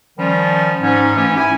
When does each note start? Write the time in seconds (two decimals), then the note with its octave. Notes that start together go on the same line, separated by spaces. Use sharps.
0.18 D#3 F3 G3 C#4
0.83 G#2 C#4
1.17 E3 A3 C#4 G4
1.37 E4 G#5